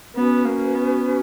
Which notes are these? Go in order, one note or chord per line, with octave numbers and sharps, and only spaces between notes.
B3 C#4 F#4 B4
A#3
B3